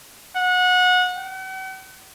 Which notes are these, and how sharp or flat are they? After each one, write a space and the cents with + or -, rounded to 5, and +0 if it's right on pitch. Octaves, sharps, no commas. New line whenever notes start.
F#5 -25
F#5 +45